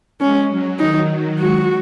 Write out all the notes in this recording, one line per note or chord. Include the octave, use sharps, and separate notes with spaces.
G#3 C#4
F#3
D#3 D#4
F#3
G#3 F#4